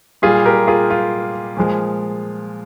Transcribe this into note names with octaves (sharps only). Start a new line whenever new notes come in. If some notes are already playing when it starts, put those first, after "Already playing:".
A#2 G3 F4 G#4
G4 A#4
F4 G#4
F4
A#2 F3 G#3